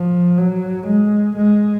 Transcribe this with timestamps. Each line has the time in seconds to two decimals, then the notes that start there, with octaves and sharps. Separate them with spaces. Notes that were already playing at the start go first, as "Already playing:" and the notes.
Already playing: F3
0.38 F#3
0.87 G#3
1.37 G#3